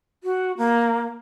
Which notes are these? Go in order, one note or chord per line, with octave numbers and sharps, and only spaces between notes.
F#4
A#3